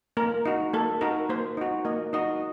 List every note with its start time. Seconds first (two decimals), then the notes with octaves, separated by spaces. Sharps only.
0.17 A#3 A#4
0.45 D#4 F#4
0.73 A#3 A4
1.01 D#4 F#4 A#4
1.29 A#3 C5
1.57 D#4 F#4
1.85 A#3 D#5
2.13 D#4 F#4 D#5